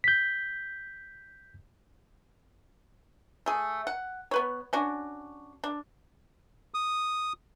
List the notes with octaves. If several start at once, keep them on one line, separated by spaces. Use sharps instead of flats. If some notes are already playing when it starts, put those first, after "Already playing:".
G6 B6
A3 G#4
F#5
B3 B4 C#5
C#4 D4 F#4
D4
D#6